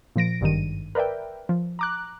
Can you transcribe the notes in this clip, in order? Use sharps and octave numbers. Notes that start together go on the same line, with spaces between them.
A#2 F3 A#6 D7
G#1 G2 D#3 D#7
A#4 B4 D5 E5 G5
F3
A#5 D6 F#6